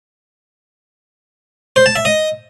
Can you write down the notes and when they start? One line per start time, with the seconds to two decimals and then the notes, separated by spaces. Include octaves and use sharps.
1.76 C5
1.86 A5
1.96 E5
2.05 D#5